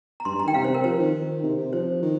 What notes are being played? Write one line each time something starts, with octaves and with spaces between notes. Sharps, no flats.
A#5
G2 C6
G2 A#5
D#3 G5
C3 F5
C5
C3
A#4
F3 C5
D#3
C3
C3
F3 C5
D#3